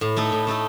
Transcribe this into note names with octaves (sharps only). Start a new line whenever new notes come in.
A2
A3 D#4 A4
A2
A3 D#4 A4